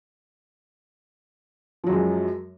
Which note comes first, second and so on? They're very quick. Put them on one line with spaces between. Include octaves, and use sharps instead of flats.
F3 F#3 F#2 G#3